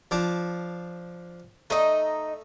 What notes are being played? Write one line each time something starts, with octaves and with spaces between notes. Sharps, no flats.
F3 D4 D6
A3 D#4 D#5